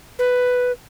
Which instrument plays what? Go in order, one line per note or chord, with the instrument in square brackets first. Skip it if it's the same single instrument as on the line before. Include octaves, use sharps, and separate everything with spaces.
[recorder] B4